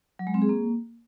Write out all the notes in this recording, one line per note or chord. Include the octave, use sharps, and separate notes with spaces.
F#3
G#3
C4
G#4
A#3